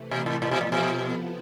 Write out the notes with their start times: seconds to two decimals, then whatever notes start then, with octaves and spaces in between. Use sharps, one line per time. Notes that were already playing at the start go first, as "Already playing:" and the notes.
Already playing: C3 E3 A3
0.11 B2
0.26 A2
0.42 A2 F3 B3 F4 A4
0.51 B2
0.61 A2
0.72 B2
1.03 C3 F3 B3 E4